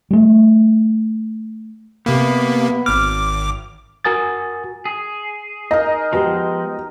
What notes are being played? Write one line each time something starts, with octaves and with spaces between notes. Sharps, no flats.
G3 A3
C3 A#3 B3
G#1 D6 F6
F#4 A#4 G#5 D#6 A6
G#4
D#4 A#4 D#5
F3 G#3 B3 F#4 G4